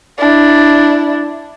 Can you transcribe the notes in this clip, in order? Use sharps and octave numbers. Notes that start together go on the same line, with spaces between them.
D4 E4